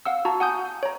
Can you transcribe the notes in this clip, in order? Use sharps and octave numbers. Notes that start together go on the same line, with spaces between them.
F5 F#5 E6
F#4 A5 A#5
F#5 G#5 D#6 G6
C#5 A#5